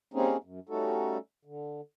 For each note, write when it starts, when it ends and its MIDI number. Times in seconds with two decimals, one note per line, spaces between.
0.14 0.37 55
0.14 0.37 58
0.14 0.37 60
0.14 0.37 61
0.14 0.37 63
0.14 0.37 68
0.44 0.60 42
0.69 1.18 55
0.69 1.18 57
0.69 1.18 61
0.69 1.18 63
0.69 1.18 66
0.69 1.18 69
1.45 1.81 50